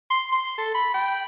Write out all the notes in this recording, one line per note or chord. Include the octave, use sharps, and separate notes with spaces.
C6
C6
A4
B5
G5